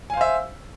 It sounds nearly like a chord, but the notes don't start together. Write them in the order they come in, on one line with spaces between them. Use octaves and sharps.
G#5 F5 C5 E5